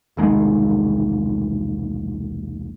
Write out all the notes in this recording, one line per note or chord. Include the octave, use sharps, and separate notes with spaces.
E1 C2 D#3 G#3